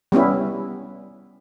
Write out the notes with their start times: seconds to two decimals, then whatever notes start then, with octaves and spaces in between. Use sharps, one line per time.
0.12 G3 B3 C#4 E4